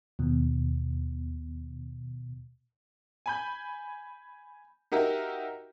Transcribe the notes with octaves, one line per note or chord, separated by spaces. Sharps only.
D#2 B2
G#5 B5 G6
D#4 F#4 G4 A#4 E5